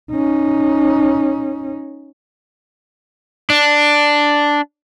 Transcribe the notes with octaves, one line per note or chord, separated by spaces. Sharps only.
C#4 D#4
D4